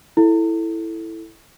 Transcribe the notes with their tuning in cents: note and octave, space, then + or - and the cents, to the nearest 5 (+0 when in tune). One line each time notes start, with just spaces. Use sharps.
E4 +0 A4 +0